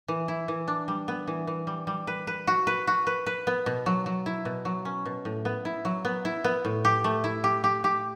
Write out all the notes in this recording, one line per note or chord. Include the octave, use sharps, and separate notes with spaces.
E3
E4
E3
D4
G3
B3
E3
E3
G3
G3
B4
B4
F#4
B4
F#4
B4
B4
B3
B2
F#3
F#3
E4
B2
F#3
C#4
B2
A2
B3
E4
F#3
B3
E4
B3
A2
G4
A3
E4
G4
G4
G4